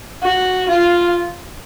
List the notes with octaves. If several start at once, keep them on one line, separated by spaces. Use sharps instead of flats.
F#4
F4